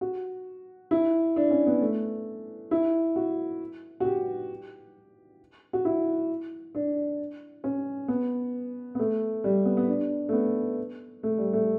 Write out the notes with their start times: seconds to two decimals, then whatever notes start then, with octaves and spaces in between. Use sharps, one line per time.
0.01 F#4
0.91 E4
1.36 D4
1.51 C#4
1.67 B3
1.81 A3
2.71 E4
3.16 F#4
4.00 F#4
4.05 G4
5.73 F#4
5.85 E4
6.75 D4
7.64 C#4
8.08 B3
8.95 B3
8.99 A3
9.44 G3
9.65 B3
9.77 B3
9.88 D4
10.29 A3
10.33 B3
11.23 A3
11.38 G3
11.53 A3